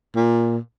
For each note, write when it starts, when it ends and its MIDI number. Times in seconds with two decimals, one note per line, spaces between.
0.15 0.57 46